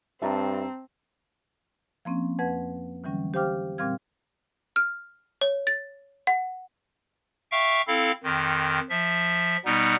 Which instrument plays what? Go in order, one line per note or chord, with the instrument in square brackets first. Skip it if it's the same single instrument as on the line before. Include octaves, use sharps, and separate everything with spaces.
[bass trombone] G2 [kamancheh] C4 [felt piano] E5 A5 A#5
[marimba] F3 A#3 C4 C#4
F2 B4 F#5 G#6
D3 E3 F#3 G3 C#4
G4 C5 F5 G5 D6 F6
A#2 G3 C4 F5 F6 G#6
[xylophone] F6
C#5
A6
F#5
[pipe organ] E5 F5 G5 C#6
C4 E4 A4 F5
F2 D#3
F3 E5
B2 G3 B3 D#4